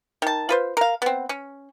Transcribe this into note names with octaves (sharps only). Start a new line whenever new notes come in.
D#3 A5
F4 B4 C5
A#4 F5
B3 C4
C#4